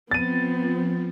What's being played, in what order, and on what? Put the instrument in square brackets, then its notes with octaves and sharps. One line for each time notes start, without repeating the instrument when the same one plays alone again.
[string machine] F3 [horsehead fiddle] B3 C4 [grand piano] A6 D#7